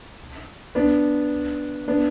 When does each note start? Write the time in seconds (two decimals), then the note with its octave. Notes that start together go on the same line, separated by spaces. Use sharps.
0.75 B3 D4
1.88 B3 D4